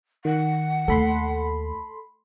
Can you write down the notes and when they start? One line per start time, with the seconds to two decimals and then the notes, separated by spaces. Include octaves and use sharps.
0.25 D#3 F#5
0.88 D#2 A3 A4 B5 C6